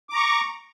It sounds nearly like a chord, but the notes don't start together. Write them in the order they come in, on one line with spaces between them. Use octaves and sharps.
D6 A#5 C#6